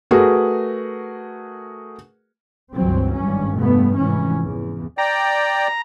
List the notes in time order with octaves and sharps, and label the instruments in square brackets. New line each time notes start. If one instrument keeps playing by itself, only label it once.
[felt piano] A3 F#4 G#4 A#4 B4
[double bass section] G1 C#2 E3 F#3 C4
G#1 G2 C#4
F1 G2 A3 B3
F1 G#2 E3 C#4
E2
[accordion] D5 G5 [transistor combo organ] A#5